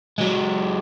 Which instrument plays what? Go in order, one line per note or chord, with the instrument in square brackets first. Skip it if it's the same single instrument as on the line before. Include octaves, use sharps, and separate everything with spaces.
[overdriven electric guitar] F#3 G#3